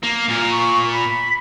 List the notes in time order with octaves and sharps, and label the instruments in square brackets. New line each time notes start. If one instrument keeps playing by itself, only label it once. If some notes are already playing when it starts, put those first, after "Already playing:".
[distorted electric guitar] A#3
A#2 A#4
[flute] C#6
B5